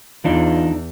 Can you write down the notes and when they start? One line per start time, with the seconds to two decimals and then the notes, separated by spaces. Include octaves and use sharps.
0.24 E2 E3 D4 D#4 F4